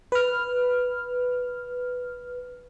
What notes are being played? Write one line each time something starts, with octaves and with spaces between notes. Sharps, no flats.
B4 F6